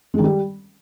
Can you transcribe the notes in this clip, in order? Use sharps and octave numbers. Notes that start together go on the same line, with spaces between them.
G#3
D#3
G3